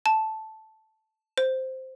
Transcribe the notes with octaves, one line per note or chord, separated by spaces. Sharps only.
A5
C5